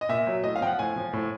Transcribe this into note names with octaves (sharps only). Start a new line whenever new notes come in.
D#5
A#2 E5
F#3
A2 D#5
F5
F3 G5
F#5
A2 G#5
F3
A2